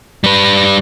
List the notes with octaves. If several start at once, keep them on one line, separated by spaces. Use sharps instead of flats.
G3 B4